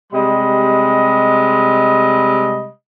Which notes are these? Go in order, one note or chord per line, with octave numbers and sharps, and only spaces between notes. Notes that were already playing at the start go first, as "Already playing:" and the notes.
C3 G3 G#3 D#5 B5